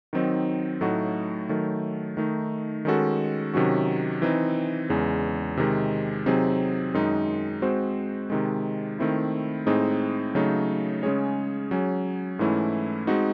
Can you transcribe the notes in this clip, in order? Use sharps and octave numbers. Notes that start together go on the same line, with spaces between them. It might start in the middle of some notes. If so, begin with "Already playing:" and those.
D#3 F#3 C4 D#4
A2 F#3 A3 D#4 F#4
D#3 F#3 A3
D#3 A3 D#4
D#3 G#3 C#4 F#4 A4
C3 D#3 F#3 C#4 F#4
E3 C4 D#4
E2 C#3 G#3
C3 D#3 G#3
C3 F#3 C4 D#4 G#4
F#2 D#3 G#3 D#4
G#3 C4 F#4 C5
C3 D#3 G#3
D#3 A3 C4 E4
A2 G#3 C4 D#4 G#4
C#3 F#3 A3 D#4
C#3 G#3 C#4 G#4 C#5
F#3 C#4 G#4
G#2 E3 A3 C#4 E4
G#3 C4 D#4 F#4